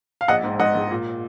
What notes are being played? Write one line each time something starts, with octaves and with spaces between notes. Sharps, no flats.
F5
A#1 D#5 F#5
G#2
G#2 D#5 F#5
G#2
A#2